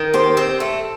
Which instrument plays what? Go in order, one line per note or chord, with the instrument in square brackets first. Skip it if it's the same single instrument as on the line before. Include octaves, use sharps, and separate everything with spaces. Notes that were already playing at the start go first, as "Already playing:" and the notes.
Already playing: [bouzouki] D#3
[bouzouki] G4 [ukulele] C5
[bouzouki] C4
A3